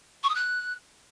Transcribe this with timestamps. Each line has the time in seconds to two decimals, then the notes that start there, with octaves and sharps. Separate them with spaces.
0.23 C#6
0.29 D#6
0.35 F#6